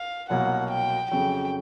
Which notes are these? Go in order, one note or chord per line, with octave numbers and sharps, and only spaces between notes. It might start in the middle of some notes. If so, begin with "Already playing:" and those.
Already playing: F5
C2 B2 F#3 A#3 F#5
G5
F2 C#3 F#3 G5